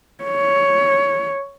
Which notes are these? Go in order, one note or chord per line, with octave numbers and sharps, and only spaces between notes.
C#5